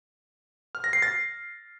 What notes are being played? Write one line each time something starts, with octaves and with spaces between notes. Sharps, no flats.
F6
A#6
C7
A6